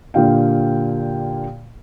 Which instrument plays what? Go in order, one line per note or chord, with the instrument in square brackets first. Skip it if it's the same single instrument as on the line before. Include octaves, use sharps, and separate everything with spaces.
[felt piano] A#2 D3 G4 F5 G5